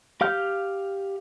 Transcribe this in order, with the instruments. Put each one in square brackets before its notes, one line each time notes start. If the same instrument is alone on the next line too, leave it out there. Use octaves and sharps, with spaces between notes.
[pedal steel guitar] G4 F5 F6 G6